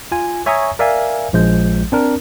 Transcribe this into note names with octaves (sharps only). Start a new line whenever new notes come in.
F4 G#5
C#5 E5 G#5 A#5 C#6 D#6
A#4 D5 E5 F5 G#5
A#1 F3 G#3 G6
C4 D4 A#4